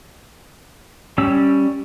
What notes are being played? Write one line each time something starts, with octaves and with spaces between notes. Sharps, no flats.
G3 C#4 E6